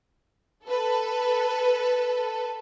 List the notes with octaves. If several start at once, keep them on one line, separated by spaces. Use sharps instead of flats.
A4 B4